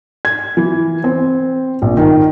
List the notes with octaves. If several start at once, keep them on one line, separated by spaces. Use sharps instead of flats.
G#6
E3
C4
A#1
D#3